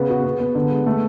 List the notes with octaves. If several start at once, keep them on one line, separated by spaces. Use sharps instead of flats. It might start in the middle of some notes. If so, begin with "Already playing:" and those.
Already playing: C#3 B3
F#4
B3
B3
D3
G#3
A3